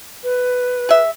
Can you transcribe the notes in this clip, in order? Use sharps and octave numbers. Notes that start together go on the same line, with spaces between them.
B4
G#4 E5